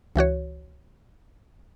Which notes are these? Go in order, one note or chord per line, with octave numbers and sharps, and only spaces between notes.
C#2 E3 F#4 C#5